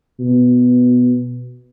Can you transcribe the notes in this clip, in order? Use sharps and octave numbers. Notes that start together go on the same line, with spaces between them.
B2